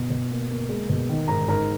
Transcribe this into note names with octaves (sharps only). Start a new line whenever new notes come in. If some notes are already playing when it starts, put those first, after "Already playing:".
Already playing: B2
B2
A#3
A#3
G#3
B2
D#3
G#2 A#4 A#5
G#2 A#4 A#5